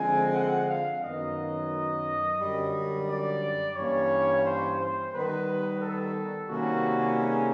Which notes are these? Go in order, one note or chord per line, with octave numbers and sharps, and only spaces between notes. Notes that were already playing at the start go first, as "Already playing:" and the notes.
Already playing: D3 F3 G#3 C4 G#5
F#5
F5
F#2 D#3 F#3 B3 D#5
F#2 D3 G3
D5
G2 E3 G3 A#3 C#4 C#5
C5
C5
D#3 G3 B3 B4
A4
C3 D#3 G3 A#3 C#4 F#4
G#4